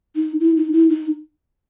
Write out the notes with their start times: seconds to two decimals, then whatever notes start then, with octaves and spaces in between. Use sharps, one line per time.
0.16 D#4
0.40 E4
0.57 D#4
0.72 E4
0.89 D#4